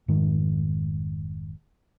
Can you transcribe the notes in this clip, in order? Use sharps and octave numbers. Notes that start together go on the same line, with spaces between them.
F1 G#2 D#3